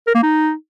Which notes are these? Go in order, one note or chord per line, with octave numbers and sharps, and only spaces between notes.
A#4
A#3
D#4